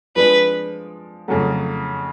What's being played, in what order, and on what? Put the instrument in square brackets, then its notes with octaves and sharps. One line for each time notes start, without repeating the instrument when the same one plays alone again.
[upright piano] F3 G#3 D4 [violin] B4
[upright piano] F2 C#3 F#3 A3